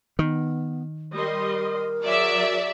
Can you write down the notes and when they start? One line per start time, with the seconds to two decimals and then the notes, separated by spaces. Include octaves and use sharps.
0.19 D#3 B3
1.16 G3 A#4 D#5 C6
2.03 F#3 G#4 D5 E5